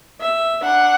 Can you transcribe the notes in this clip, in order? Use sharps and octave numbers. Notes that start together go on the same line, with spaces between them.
E5
D4 F#5